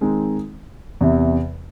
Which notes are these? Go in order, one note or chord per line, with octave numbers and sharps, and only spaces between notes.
D#3 G#3 C4 D#4
E2 C3 E3